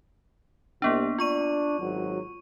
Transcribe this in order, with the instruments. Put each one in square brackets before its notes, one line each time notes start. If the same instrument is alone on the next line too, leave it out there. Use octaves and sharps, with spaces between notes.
[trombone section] C2 [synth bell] A#3 B3 D4
[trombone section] D4 [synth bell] F4 C#6 D#7
[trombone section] G#1 F#3